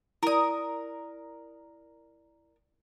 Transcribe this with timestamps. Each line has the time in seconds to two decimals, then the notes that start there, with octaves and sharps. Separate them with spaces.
0.23 E4 A#4 D5 D#6